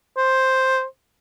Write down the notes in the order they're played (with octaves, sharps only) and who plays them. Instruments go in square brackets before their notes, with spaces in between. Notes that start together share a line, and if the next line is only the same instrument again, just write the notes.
[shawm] C5